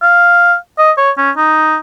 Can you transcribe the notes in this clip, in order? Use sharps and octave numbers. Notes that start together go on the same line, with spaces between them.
F5
D#5
C#5
C#4
D#4